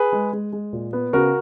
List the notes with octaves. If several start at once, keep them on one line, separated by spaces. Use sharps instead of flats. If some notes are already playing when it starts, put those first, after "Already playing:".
Already playing: G#4 B4
G#3
G#3
G#3
A#2
B3
C#3 F#4 A#4